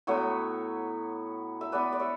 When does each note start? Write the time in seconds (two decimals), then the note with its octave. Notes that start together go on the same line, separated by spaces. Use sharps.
0.07 A2 F#3 B3 C#5 E5
1.61 E5
1.72 E3 B3 B4 D5
1.93 D5
2.00 C#5 E5